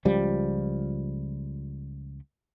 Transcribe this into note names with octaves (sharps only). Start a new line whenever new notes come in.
C#2 F3 G3